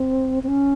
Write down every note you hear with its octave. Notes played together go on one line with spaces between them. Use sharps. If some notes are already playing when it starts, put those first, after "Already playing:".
Already playing: C4
C4
C#4